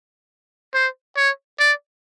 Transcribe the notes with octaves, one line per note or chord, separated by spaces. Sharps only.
C5
C#5
D5